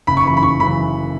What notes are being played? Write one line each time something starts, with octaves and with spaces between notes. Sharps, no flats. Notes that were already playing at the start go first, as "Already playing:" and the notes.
F#1 B5
C#6
F#2 C#3 E3 B5
B5
F#1 C#6
F#2 C#3 E3 B5